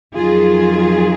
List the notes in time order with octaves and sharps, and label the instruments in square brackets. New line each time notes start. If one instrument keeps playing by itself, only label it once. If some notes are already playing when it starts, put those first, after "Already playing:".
[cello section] F2 D#3 F#3 F4 G#4